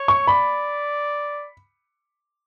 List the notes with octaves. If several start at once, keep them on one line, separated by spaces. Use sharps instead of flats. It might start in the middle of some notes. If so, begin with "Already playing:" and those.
Already playing: C#5
C#6
D5 B5